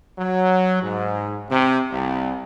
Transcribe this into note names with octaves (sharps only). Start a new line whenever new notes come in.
F#3
G#2
C3
C2